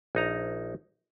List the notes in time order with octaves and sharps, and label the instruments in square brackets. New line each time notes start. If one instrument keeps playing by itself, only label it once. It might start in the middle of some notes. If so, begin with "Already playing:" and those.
[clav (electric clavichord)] A#1 D#4 A#5